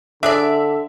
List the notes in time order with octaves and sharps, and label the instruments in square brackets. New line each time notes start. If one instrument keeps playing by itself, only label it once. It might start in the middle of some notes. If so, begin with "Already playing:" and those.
[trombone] D3 [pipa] D4 G#4 D5 [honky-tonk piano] E5